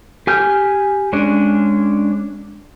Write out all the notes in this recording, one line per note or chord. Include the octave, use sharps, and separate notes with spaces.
G4 G#5 F6 G6
G#3 C#4 D4